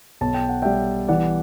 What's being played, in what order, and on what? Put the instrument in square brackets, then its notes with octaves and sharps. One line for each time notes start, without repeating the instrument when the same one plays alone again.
[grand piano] B1 A5
G5
F#5
G3 E5 G5
E3 D5 F#5